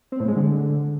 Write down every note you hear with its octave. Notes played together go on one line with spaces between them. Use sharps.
C4
A2
G#3
D3